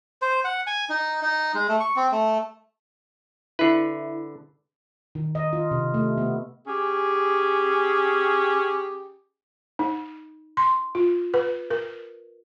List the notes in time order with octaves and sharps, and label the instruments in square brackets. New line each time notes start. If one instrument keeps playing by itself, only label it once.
[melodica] C5
F#5
G#5
D#4
D#4
G#3
A3
C#6
C4
A3
[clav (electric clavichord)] D3 B4 [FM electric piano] E4
[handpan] D#3
D#5
F4
C3
A3
B3
[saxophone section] C#4 G4 G#4
[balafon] D#4
C6
F4
B4
A#4